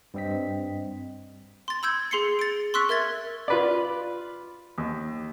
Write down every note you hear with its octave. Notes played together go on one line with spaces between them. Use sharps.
G2 G3 C4 D#5 B6
C6 A6
B5 E6 G6 G#6
G#4 C6 C7 C#7
A6 D7
C6 C#6 E6 F#6 B6
A#4 E5 G#6 A6
F4 B4 D5
D#2